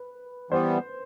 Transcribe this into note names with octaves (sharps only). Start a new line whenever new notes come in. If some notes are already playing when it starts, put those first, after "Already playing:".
Already playing: B4
E3 G3 B3 C5